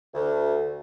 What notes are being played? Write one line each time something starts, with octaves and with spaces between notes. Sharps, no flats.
D2